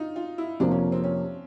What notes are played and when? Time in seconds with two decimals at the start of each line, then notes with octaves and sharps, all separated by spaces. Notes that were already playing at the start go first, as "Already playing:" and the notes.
Already playing: D#4 F4
0.16 F4
0.38 E4
0.60 F2 C3 F3 A#3 D4
0.71 C#4
0.92 C4
1.04 C#4